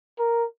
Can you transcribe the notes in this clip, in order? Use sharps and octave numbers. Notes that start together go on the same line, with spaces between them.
A#4